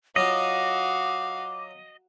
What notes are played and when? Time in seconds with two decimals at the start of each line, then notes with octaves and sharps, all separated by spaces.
0.16 F#3 F4 F#4 D#5 F5 D6